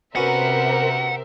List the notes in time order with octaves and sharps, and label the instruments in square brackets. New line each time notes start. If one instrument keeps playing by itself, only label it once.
[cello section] C3 [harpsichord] B3 C#4 F#4 [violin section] A#4 C5 E5 [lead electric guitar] F#5